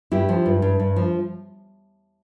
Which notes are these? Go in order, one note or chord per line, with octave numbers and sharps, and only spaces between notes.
G2 E4 G4
F3
G2
G2
G2
F3